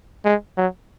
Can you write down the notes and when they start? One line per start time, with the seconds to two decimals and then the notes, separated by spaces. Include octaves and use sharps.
0.25 G#3
0.57 F#3